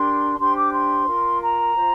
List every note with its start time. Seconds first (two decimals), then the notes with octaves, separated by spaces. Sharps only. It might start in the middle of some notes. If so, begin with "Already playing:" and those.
Already playing: D4 G4 A#4 C6
0.38 D4 G4 C5 C6
0.55 D6
0.71 C6
1.06 F4 A#4
1.39 A#5
1.74 F4 C5